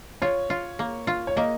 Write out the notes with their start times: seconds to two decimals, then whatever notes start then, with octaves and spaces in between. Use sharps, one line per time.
0.22 F4 C#5
0.50 F4
0.79 A#3
1.07 F4
1.27 C#5
1.36 A#3 D#5